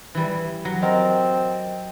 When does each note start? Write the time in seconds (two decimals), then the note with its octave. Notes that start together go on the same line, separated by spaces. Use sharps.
0.15 E3 G3
0.65 F#3
0.82 C4 A#4 D#5